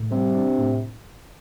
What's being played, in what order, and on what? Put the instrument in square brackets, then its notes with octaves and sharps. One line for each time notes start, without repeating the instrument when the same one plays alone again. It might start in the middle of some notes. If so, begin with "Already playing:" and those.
Already playing: [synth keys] A2
[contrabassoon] C3 [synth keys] G3
[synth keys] D4
A2